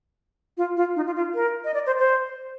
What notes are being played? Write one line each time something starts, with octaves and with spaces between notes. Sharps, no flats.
F4
F4
D#4
F4
F4
A#4
D#5
D5
C5
C5